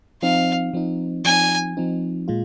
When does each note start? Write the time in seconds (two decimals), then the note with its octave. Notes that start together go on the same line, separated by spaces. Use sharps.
0.22 F3 C4 D#4 F5
0.73 F3 C4 D#4
1.25 F3 C4 D#4 G#5
1.77 F3 C4 D#4
2.28 A#2 G#3 F4